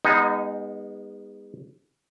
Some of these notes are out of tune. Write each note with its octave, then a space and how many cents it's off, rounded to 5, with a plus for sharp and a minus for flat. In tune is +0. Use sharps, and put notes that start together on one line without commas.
G#3 -35 B3 +0 D#4 +5